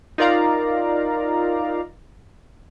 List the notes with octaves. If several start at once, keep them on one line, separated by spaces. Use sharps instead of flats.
D#4 F4 A#4 D5 F5 A#5